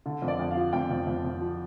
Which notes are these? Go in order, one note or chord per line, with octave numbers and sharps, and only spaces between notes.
D3
F2
D5
F2
F5
F3
F2 G5
F2
F2
F2
F3